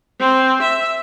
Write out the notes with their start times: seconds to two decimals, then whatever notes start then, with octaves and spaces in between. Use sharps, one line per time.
0.20 C4
0.62 E5